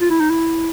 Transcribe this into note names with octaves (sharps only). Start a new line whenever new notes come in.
F4
E4
D#4
E4